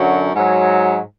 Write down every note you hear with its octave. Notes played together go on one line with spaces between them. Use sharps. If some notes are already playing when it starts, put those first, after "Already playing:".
Already playing: F#2 D3 F#3
G#2 F#3